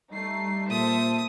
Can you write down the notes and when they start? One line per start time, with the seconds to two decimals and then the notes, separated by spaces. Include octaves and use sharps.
0.12 G3 A3 D#4 C7
0.71 A#2 A4 C5 E5 D#6